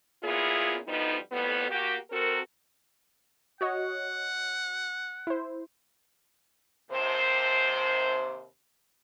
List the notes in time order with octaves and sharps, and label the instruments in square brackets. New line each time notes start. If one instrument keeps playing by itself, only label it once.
[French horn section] A#2 B3 C#4 E4 F4 G#4
D2 F3 G3 B3 D#4
F2 A2 G3 B3
A#3 F#4 G4
C4 F#4 A4 A#4
[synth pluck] F#4 C#5 D#5 [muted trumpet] F#5
[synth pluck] E4 C5
[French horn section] D#2 C3 C5